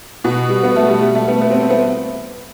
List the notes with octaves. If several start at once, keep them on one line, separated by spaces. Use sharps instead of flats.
B2
G3
B3
A3
G3
G3
A3
B3
B3
C4
C4
B3